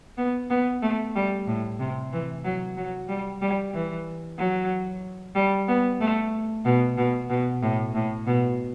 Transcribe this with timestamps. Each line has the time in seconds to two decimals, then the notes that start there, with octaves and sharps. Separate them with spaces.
0.18 B3
0.50 B3
0.82 A3
1.15 G3
1.47 A2
1.80 C3
2.12 E3
2.44 F#3
2.77 F#3
3.09 G3
3.42 G3
3.74 E3
4.38 F#3
5.35 G3
5.68 B3
6.01 A3
6.65 B2
6.97 B2
7.30 B2
7.62 A2
7.95 A2
8.27 B2